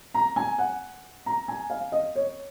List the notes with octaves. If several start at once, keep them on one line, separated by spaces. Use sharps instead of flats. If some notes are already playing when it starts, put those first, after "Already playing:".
A#5
G#5
F#5
A#5
G#5
F5
D#5
C#5